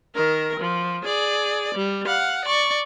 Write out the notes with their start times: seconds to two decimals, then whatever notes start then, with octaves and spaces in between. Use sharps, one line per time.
0.15 D#3 A#4
0.59 F3
1.05 G#4 D5
1.74 G3
2.06 F5 F#5
2.45 D5 C#6